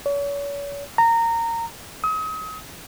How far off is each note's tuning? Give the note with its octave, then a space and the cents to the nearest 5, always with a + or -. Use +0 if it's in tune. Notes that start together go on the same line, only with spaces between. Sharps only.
C#5 +40
A#5 -20
D#6 +35